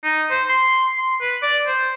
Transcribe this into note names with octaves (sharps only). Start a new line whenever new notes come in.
D#4
C5
C6
C6
B4
D5
C5